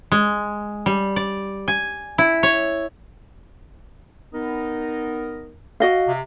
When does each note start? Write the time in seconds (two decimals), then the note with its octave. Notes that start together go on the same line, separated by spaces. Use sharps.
0.12 G#3
0.86 G3
1.16 D5
1.68 G#5
2.18 E4
2.43 C#5
4.34 B3 D#4 A#4
5.80 F#4 D#5 F5
6.07 C3